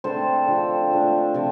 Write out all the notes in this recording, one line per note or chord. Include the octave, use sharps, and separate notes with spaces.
D3 A3 C4 A4 C5
D3 F3 C4
F3 A3 D4
C3 F3